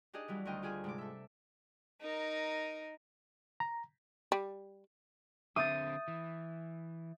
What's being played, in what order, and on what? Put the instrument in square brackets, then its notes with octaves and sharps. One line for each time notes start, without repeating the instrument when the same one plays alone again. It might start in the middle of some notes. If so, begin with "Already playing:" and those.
[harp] D4 D#4 G4 G#4 D#5
E3 F#3 G3
D2 D#3 D4 A#4 D#5 G5
F4 G4 G#4 G#5
G#2 C3 D6
A4 E5
[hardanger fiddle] D#4 A#4
[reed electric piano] A#5
[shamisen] G3
[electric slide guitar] D3 C4 [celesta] E5 G6 A6 [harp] D#6
[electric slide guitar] E3